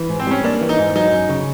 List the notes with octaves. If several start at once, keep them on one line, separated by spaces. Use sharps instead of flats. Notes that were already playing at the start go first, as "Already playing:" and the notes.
Already playing: E3
G#2
C4
G3 C#4
A#3 D4
E3
D#4
G#2
F#3 D#4
F#2
C#3